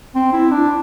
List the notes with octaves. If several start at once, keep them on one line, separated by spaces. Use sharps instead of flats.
C4
E4
D4